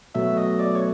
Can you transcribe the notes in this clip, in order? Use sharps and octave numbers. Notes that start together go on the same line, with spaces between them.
B2 F#3 A3 E5
D#5
D5
C#5